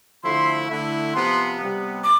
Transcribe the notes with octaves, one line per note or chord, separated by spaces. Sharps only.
D3 F3 A3 E4 C6
D3 A3 E4
C3 F3 B3 C6
C3 G3 B3
D6